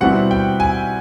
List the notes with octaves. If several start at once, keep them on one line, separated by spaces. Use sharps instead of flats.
B2 G3 C4 E4 F#5
G5
G#5